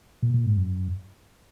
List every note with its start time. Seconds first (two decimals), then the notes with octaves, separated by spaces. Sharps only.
0.23 A#2
0.34 A#2
0.46 G#2
0.57 F#2